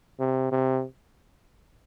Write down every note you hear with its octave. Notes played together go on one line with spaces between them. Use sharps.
C3
C3